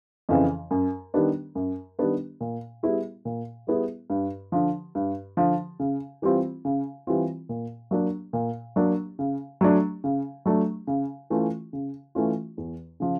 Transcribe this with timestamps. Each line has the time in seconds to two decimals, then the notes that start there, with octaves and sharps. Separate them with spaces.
0.29 F2 C#3 E3
0.71 F#2
1.14 D#3 G3 B3 D4
1.55 F#2
1.99 D#3 G3 B3 D4
2.41 A#2
2.83 G3 B3 E4 G#4
3.25 A#2
3.67 G3 B3 E4 G#4
4.10 G2
4.52 D3 F3
4.95 G2
5.37 D3 F3
5.80 C#3
6.22 E3 G3 C4 F4
6.65 C#3
7.07 E3 G3 C4 F4
7.49 A#2
7.91 F#3 A#3 D4
8.33 A#2
8.76 F#3 A#3 D4
9.19 C#3
9.61 F#3 A3 D4
10.04 C#3
10.46 F#3 A3 D4
10.87 C#3
11.30 E3 A3 C#4 F4
11.73 C#3
12.15 E3 A3 C#4 F4
12.58 E2
13.00 C#3 F3